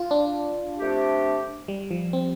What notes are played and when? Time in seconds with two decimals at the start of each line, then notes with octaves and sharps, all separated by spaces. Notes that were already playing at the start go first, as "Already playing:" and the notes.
Already playing: F4
0.11 D4
0.78 C3 A3 D4 G4
1.68 G3
1.91 F3
2.13 C4